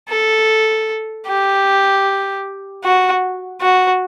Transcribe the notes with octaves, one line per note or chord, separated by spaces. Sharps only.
A4
G4
F#4
F#4